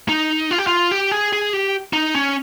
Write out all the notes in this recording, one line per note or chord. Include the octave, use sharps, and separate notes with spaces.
D#4
F4
G4
F4
G4
G#4
G#4
G4
D#4
C#4